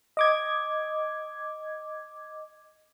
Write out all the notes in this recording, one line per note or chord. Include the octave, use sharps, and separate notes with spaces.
D#5 D6 G#6